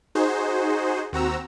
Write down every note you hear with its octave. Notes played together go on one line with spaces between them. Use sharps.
D#4 F#4 G#4 C5
D#2 C4 F#4 A#5 E6